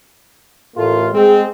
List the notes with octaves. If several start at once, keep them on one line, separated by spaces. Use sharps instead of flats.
A1 A2 A3 A#3 F4
G#3 C4